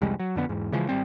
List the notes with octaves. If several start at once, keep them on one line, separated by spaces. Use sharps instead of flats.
C2 F2 G3 G#3
F#3
F2 D3 B3
E2 G#2
C#3 E3 F3 G#3
G#1 G3 C4